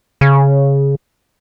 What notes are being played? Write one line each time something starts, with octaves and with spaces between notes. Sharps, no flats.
C#3